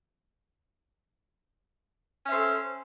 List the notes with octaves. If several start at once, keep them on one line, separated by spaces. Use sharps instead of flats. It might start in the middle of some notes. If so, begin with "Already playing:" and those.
C#4 A4 C5 E5